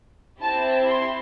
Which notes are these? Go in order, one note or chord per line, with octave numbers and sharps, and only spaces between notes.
C4 E4 G4 A5
C6